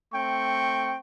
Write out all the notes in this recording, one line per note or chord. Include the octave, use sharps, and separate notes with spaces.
A3 C4 G5 C#6